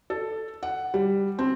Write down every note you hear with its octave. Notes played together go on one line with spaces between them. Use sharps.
A4
F#5
G3
C4